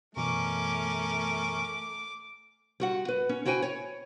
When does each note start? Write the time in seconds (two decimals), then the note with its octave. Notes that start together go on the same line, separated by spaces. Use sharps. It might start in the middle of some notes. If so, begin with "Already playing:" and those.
0.17 F#2 B2 E3 A3 C#4 A#4 D6
2.80 G3 F#4 F#5
3.08 B4
3.29 C#4
3.45 E4 F#4 C5 G5 G#5
3.62 C#5